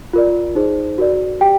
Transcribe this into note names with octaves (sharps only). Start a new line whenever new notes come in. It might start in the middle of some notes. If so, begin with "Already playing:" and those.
F4 A#4 D5
D#4 G#4 C5
F#4 A#4 D5
G4 G5